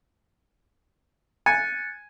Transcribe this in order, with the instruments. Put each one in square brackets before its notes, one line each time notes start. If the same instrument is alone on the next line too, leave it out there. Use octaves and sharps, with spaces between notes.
[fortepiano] G#5 [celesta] F#6 A6 C#7